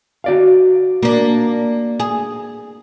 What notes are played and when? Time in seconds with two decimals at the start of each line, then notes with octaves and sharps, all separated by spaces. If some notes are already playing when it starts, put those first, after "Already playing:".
0.24 F#4 D5 F5
1.02 A#3 D4
2.00 G#4